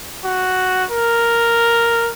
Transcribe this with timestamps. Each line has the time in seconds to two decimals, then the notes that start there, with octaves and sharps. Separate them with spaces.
0.25 F#4
0.91 A#4